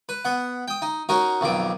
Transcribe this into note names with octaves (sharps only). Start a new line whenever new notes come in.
B4
B3 F#5
G5 D#6
D#4
C#4 D#4 F#4 A#4
B1 F2 D#3 D6